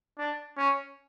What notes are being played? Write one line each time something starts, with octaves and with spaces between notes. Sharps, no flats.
D4
C#4